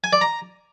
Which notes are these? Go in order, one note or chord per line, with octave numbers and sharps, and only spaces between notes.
G#5
D5
A#5